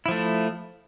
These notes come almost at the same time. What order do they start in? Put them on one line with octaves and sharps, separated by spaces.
E4 F3 A3